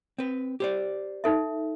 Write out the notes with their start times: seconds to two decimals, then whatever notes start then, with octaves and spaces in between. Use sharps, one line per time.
0.18 C4 B4
0.60 G4 C5 D5
1.24 D#4 A4 E5